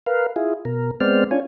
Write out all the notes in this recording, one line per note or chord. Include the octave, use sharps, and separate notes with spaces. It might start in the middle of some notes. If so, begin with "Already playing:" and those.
A#4 B4 F5
E4 F4 G#4
B2 A#4
G#3 B3 C4 C5 D5 F6
C#4 D4 F4 C#5 G#5